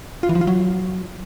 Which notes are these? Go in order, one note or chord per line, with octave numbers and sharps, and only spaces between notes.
F4
E3
F3
F4
F#3